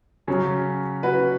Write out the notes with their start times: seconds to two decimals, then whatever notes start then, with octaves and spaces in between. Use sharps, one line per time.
0.27 C#3 F#3 C#4
1.03 F#4 B4